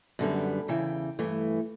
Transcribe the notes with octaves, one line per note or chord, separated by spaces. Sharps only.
F#2 D3 G3 B3
E2 C#3 E3 G5
G2 E3 A3